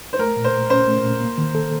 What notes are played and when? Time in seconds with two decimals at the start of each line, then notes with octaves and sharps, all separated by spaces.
0.13 C5
0.19 A3 A#4
0.36 A#2
0.44 C5
0.54 A#2
0.70 C#4 C5
0.87 A3
1.03 A#2
1.21 A#3
1.38 D#3
1.55 A4